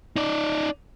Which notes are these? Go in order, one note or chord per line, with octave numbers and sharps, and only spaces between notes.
D#4 D5